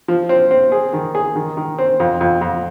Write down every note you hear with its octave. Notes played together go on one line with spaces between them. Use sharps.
F3
C4
C4
G#4
D#3
G#4
D#3
D#3
C4
F2
F2
F2